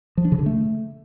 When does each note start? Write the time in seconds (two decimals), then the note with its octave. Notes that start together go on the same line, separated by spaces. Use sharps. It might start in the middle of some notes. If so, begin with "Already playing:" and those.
0.17 F3
0.25 D4
0.32 C#3
0.39 D3
0.46 A3